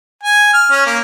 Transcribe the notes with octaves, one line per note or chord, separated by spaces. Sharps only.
G#5
F6
C#4
A#3